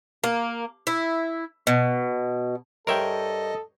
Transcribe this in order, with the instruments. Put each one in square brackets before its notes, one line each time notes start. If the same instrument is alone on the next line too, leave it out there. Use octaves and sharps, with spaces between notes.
[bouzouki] A#3
E4
B2
[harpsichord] G2 C#5 C6 [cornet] A4 [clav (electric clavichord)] A#4 E5 G5 [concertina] D#5